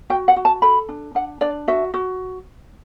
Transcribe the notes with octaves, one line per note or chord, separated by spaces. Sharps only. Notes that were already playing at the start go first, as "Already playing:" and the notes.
F#4 G5
F#5
F#4
A5
A4 B5
D4
D4 F#5
D4 D5
F#4 E5
F#4